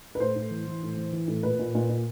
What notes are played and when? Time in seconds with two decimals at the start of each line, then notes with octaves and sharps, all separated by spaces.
0.15 B4
0.20 A2 C5
0.36 A2
0.51 E3
0.67 E3
0.83 A2
0.97 E3
1.13 E3
1.28 A2
1.43 A#2 B4
1.59 A#2
1.75 A#2
1.89 A#2